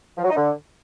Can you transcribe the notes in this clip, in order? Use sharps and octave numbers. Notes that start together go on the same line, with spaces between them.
F3
F#3
D#4
D3